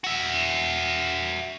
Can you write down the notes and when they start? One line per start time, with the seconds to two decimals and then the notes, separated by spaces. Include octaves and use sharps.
0.04 F#4 E5